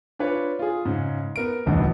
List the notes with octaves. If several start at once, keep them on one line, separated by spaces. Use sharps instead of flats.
D4 F4 B4 C#5
F4 G#4
G#2 C#3
B3 A#4 D7
D1 B1 E2 G2 C#3